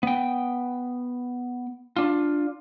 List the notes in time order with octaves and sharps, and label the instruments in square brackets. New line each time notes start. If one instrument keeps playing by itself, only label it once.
[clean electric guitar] B3 G5
D4 F4